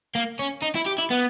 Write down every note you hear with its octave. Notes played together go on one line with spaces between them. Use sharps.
A#3
C#4
D#4
E4
G4
E4
B3